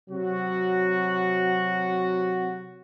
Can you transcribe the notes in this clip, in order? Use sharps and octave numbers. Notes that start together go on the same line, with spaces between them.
C3 F#3 F#4